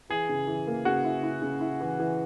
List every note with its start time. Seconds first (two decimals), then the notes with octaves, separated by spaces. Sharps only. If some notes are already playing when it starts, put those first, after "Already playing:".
0.10 E3 G#4
0.29 C#3
0.47 E3
0.67 A#3
0.85 C#3 F#4
1.04 E4
1.23 E4
1.42 C#3
1.61 E4
1.81 E3
2.00 E3